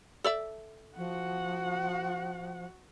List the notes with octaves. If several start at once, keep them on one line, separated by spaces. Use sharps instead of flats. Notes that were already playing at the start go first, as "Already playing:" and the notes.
A4 D5 E5
F3 F#4 F#5